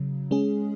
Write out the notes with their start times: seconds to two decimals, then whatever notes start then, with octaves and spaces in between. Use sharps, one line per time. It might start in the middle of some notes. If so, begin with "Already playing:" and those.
Already playing: C#3 F#3
0.31 G#3 C#4 G#4